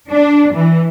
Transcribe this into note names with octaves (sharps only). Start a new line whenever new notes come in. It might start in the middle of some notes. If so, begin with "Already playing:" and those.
D4
E3